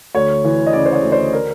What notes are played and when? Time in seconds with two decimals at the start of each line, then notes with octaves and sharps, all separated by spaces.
0.15 D2 C#5
0.44 E3
0.66 D#5
0.73 C#3 D5
0.85 C5
0.92 C#5
1.03 D2
1.12 C5
1.33 A#4